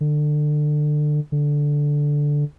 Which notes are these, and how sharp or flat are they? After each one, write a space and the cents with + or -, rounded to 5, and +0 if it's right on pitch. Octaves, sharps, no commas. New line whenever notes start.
D3 +25
D3 -5